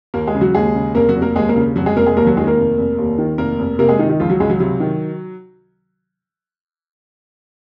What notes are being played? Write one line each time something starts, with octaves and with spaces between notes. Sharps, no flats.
D#2 A#3 A#4
G#3 G#4
C#3
F#3 F#4
D#2 G#3 G#4
C#3
F1 A#3 A#4
F#3 F#4
F1
A#3 A#4
D#2 G#3 G#4
A#3 A#4
C#3
F1 F#3 F#4
G#3 G#4
F1 A#3 A#4
G#3 G#4
D#2 A#3 A#4
F#3 F#4
D#3 G#3 G#4
A#3 A#4
F1
F1
D#2
D#3
F1 A#3 A#4
F1
C3 A#3 A#4
G#3 G#4
D#3 D#4
D#3 D#4
C#2 F3 F4
F#3 F#4
C#2 G#3 G#4
F#3 F#4
C3 F#3 F#4
D#3